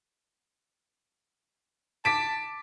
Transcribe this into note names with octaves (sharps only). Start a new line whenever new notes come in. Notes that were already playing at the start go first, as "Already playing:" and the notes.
A5 D6 B6 D7